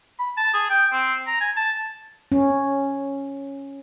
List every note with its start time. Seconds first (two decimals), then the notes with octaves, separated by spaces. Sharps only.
0.19 B5
0.37 A5
0.54 G#4
0.70 G5
0.93 C4
1.27 A#5
1.41 G#5
1.57 A5
2.32 C#4